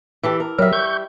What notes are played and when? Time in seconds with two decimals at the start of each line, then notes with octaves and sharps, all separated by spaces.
0.23 E3 G4 A4
0.40 A#4
0.59 F#3 G3 A#4 E5
0.73 C#6 G6